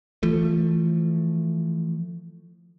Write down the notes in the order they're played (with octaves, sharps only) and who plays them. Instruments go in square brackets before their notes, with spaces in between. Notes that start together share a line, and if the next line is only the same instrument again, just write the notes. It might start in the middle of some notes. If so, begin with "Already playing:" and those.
[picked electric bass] E3 F3 A3